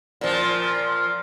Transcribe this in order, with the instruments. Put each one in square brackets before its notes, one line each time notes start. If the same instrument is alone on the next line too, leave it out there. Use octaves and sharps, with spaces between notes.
[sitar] A#2 F3